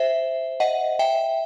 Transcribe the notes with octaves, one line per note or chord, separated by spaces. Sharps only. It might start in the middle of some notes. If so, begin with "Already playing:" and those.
Already playing: C5 E5
D#5 F#5
E5 G5